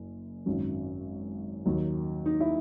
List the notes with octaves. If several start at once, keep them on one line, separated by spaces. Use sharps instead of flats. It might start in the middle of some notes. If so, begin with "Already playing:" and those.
Already playing: F#1 F#2
G#1 F#2 D#3 F#3 C#4
D#2 D#3 F#3
D#4
E4